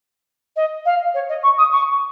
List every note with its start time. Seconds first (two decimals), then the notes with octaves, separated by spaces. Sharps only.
0.56 D#5
0.86 F5
1.14 C#5
1.29 D#5
1.43 C#6
1.58 D#6
1.72 C#6